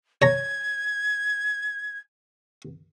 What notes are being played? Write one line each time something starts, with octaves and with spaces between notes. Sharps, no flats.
C#5 A#5 G#6